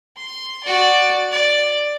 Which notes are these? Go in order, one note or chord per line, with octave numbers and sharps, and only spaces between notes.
C6
F#4 D5
D5